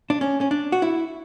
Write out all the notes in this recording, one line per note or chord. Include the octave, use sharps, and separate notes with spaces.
D4
C#4
C#4
D4
F#4
E4